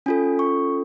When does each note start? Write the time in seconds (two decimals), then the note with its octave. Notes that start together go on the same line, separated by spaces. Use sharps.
0.06 C#4 F4 A4 G#5
0.39 C#6